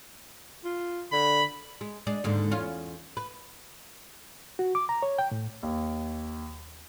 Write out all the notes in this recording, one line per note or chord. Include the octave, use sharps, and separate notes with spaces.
F4
D3 B5
G#3
G#3 D4
D#2 G#2 D3
E2 C#4 F4
B4
F#4
D6
A#5
C#5
G5
A2
D#2